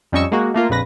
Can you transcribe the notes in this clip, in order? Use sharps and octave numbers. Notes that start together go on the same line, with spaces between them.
F2 G3 C#4 D#5 C#6 E6
G#3 A#3 F#4
A3 A#3 F4 A#4
A#1 F2 B4 A#6